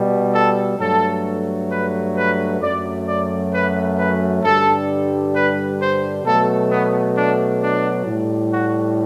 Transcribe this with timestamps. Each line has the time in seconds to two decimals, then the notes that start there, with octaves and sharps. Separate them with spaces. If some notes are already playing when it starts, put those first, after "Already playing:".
Already playing: B2 G3
0.33 A4
0.78 G2 F#3 A3 A4
1.70 B4
2.15 B4
2.61 F#2 F#3 A3 D5
3.06 D5
3.52 B4
3.97 B4
4.43 G2 D3 G3 A4
5.34 B4
5.80 C5
6.25 B2 F#3 A3 A4
6.70 B3
7.16 D4
7.62 D4
8.06 A2 G3
8.53 F#4